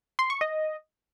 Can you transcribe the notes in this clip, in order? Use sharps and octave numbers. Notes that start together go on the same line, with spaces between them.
C6
C#6
D#5